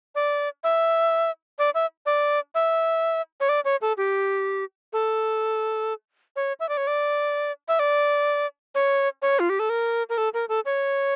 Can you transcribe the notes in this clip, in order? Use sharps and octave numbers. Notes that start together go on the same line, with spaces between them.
D5
E5
D5
E5
D5
E5
C#5
D5
C#5
A4
G4
A4
C#5
E5
D5
C#5
D5
E5
D5
C#5
C#5
F4
G4
A4
A#4
A#4
A4
A#4
A4
C#5